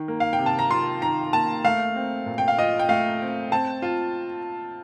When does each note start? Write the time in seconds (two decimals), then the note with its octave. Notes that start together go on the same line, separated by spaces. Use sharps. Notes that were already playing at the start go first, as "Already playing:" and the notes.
Already playing: D#3
0.08 A#3
0.20 F5
0.33 G5
0.39 C3
0.46 A5
0.59 A#5
0.71 F4 C6
1.02 D#3 A#5
1.33 A#3 A5
1.65 A3 F5
1.96 C4
2.26 A#2
2.38 G5
2.48 F5
2.59 F4 D#5
2.79 G5
2.89 A3 F5
3.21 C4
3.52 C4 A5
3.82 F4